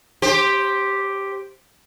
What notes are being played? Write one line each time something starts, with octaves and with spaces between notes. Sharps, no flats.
G4 C5